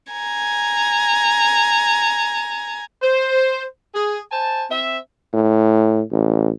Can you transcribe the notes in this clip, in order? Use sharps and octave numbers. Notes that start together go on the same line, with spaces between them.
G#5 A#5
C5
G#4
C5 G#5 A5
C4 E5
A2
A1